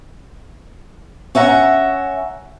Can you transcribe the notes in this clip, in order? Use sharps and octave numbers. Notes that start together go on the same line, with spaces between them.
C#4 E5 F#5 A#5